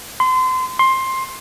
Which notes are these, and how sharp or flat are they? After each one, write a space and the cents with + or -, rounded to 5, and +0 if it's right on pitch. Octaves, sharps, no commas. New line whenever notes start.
C6 -30
C6 +15